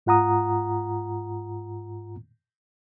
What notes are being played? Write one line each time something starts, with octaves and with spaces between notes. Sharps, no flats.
G#2 F4 F#5 A#5 D#6